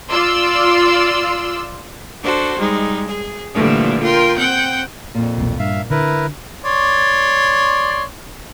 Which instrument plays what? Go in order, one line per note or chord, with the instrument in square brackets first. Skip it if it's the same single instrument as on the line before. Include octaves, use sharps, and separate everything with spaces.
[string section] F4 D5 C6 E6
[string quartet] D4 F#4 A4 C5
G3 G#3 D#4
G#4
A#2 D3 E3 F3 G3 A3
F4 A#4 G5 C6
C4 F#5 G5 G6
[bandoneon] F2 [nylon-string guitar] A#2
[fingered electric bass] E1 B1 A#3
[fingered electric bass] G2 [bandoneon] E5 F5
[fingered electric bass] D3 [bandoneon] E4 A#4 B4
[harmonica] C#5 D5 C6